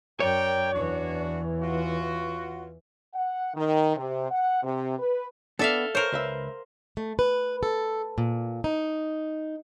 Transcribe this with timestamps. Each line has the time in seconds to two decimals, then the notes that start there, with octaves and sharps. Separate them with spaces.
0.20 F#2 A#4 C#5 D5 G5
0.74 E2 E3 D4 F#4
1.62 F4 F#4
3.13 F#5
3.54 D#3
3.97 C3
4.30 F#5
4.63 C3
4.99 B4
5.59 B3 D4 A4 D5 E5 F5
5.95 A#4 C5 C#5
6.12 C#2 B4 E5
6.97 A3
7.19 B4
7.63 A4
8.18 A#2
8.64 D#4